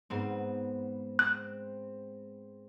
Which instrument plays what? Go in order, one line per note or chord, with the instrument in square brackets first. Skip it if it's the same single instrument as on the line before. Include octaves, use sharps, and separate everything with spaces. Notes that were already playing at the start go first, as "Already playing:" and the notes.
[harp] G#2 B3 C4
[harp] C4 [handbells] F#6